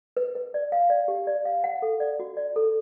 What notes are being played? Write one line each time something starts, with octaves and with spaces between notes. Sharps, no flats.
B4
B4
D5
F5
D5
G4
D5
F5
F#5
A4
D5
F#4
D5
A4